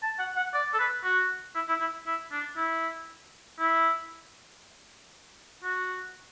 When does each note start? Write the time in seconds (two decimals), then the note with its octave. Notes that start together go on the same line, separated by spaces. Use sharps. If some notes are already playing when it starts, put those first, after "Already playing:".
0.03 A5
0.19 F#5
0.37 F#5
0.54 D5
0.74 A4
0.79 B4
1.04 F#4
1.55 E4
1.68 E4
1.80 E4
2.06 E4
2.32 D4
2.57 E4
3.59 E4
5.64 F#4